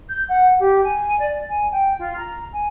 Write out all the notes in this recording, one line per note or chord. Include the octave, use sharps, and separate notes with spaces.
G6
F#5
G4
G#5
D5
G#5
G5
F4
A#5
G#5